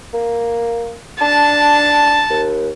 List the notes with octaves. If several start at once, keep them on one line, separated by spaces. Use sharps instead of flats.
A#3
D4 A5
D#2